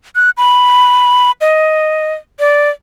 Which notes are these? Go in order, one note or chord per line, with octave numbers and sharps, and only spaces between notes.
F#6
B5
D#5
D5